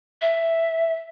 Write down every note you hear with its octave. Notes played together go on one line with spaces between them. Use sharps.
E5